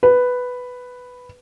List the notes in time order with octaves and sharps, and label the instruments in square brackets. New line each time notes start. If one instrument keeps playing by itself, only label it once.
[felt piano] B4